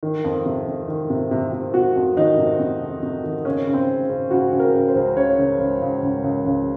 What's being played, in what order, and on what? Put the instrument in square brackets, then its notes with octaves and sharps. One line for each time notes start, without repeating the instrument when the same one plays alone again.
[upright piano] D#3
F2
C3
F2
D#3
C3
C3
C3
C3 F#4
F2
D#3 D#4
C3
C3
F2
C3
D#3
C#3 C#4
C#3
C4
C#3
C#3
C#3 F#4
C#3
A#4
C#3
C5
C#2
C#3 C#5
C#3
C#2
C#2
C#2
C#2
C#2